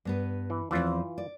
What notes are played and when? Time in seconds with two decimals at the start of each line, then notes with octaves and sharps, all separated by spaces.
0.05 G2 B3 B4
0.50 E3
0.71 E2 E3 F3 C4 F4
1.18 D5